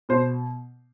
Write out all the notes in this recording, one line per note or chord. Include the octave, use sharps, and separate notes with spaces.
B2 C5